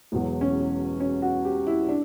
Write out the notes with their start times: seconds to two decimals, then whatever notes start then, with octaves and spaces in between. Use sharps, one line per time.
0.12 E1 E2 B2 F#3
0.41 C#4
1.00 C#4
1.22 F#4
1.45 G4
1.67 E4
1.89 D4